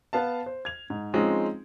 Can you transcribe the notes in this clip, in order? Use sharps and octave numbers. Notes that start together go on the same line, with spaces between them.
B3 F5 A5
C5
G#6 F7
G#2
F3 G#3 C4 C#4 D#4 F4